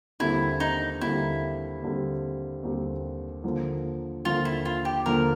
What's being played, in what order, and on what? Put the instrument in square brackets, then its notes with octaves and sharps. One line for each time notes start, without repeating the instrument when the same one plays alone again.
[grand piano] D#2 D3 G3 C4 [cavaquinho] E4
[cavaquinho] D#4
[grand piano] D#2 D3 G3 C4 [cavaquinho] E4
[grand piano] D#2 D3 G3 C4
D#2 D3 G3 C4
D#2 D3 F3 A#3
[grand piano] D#2 D3 F3 A#3 [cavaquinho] F4
[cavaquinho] E4
F4
G4
[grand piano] D#2 D3 F3 A#3 [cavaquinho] A#4